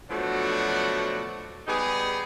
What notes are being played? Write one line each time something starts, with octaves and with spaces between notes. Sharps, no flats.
B2 F3 F#3 A3 D4 F#4
G3 B3 D#4 G4 G#4